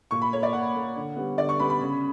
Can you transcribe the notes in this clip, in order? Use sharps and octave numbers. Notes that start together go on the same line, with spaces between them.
A#2 C#6
B5
A#3 C#5
D5
A#2 F#5
A#3
D3
G3 B3
D3 D5
C#6
G3 B3 B5
B5
C#3